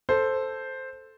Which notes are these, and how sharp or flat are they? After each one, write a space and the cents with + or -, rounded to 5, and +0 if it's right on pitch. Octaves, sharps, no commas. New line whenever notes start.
A4 +0 C5 +0